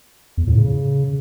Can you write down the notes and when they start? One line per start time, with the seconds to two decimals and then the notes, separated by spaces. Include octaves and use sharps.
0.38 E2
0.47 A2
0.57 C#3